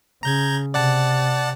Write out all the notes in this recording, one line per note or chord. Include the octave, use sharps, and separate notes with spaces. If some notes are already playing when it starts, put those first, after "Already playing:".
C#3 A#5 G6 G#6
C3 D5 F#5 A5